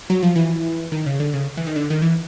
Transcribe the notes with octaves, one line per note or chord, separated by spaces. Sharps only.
F#3
F3
E3
D#3
C#3
D3
C#3
E3
D#3
D3
D#3
E3